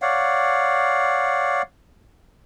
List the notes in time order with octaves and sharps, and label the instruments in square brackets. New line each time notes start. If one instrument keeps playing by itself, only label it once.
[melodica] C#5 D5 F5 F#5